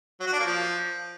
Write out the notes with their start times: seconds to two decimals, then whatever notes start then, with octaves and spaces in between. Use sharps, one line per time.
0.20 F#3
0.27 F#4
0.33 D4
0.39 A#3
0.45 F3